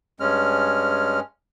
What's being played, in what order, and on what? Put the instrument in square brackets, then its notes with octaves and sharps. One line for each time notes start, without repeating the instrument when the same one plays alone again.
[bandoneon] G2 G#3 C#4 F6